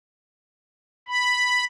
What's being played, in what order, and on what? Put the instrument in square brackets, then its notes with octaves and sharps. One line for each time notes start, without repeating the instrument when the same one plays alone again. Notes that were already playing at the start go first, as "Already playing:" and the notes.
[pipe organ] B5